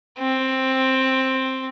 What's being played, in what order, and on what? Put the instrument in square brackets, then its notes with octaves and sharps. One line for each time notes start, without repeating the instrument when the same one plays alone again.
[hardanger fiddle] C4